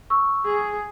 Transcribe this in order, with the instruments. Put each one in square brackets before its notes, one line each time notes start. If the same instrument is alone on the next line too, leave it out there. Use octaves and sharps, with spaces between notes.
[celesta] C#6 E6
[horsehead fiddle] G#4